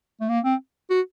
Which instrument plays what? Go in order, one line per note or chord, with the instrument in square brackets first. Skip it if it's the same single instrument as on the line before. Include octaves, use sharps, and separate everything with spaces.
[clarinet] A3
A#3
C4
F#4